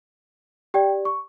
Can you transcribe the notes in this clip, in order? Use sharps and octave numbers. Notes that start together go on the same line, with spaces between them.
G4 D5 G5
C#6